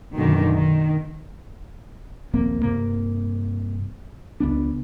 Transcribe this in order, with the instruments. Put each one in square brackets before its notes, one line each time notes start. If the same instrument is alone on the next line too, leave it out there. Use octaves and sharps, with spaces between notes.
[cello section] F#2 B2 D3 D#3 A3
D#3
[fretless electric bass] D#1 A#1 A#3 C4
G2 C3 A#3
C#2 B3 D4